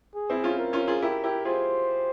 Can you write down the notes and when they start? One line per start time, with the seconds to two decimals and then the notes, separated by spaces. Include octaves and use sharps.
0.15 G#4
0.30 C4 E4
0.44 C#4 F4
0.59 A#4
0.73 C#4 F4
0.87 F4 G#4
1.02 E4 G4 A#4
1.24 E4 G4
1.45 F4 G#4 C5